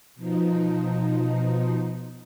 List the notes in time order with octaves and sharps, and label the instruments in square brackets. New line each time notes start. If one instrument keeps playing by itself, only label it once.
[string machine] B2 F3 D#4